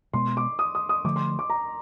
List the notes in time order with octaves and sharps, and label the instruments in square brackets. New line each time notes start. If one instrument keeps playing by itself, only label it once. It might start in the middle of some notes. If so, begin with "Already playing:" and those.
[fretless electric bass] B2 G#3 B3 [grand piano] C6
[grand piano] D6
D#6
D#6
D#6
[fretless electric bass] D3 F3 A3 [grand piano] D6
[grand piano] C6
D6
A#5